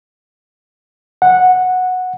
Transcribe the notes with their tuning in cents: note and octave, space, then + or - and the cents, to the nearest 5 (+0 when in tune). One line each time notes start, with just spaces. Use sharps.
F#5 -10